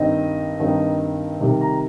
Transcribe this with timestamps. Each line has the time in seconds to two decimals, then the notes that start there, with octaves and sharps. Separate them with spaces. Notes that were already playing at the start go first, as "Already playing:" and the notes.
Already playing: G2 D#3 C4 D#4 D#5
0.60 G2 D#3 C4 D#4
1.41 C3 D#3 G3
1.61 A#5